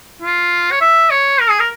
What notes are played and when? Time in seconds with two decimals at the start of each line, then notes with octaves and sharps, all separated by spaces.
0.22 F4
0.71 C#5
0.81 E5
1.11 C#5
1.40 A#4
1.49 G#4
1.60 A#4